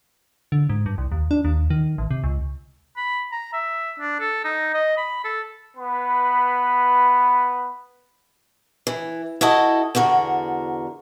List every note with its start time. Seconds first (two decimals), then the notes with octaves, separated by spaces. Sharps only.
0.52 D3
0.69 G#2
0.86 G2
0.98 C2
1.12 D#2
1.31 D4
1.45 D#2
1.70 D#3
1.98 A1
2.11 C3
2.24 C#2
2.97 B5
3.32 A#5
3.53 E5
3.99 D4
4.20 A4
4.45 D#4
4.74 D#5
4.97 B5
5.24 A4
5.77 B3 B4 B5
8.87 E3
9.41 E4 F#4 A4 D#5
9.95 E2 D3 F#4 A#4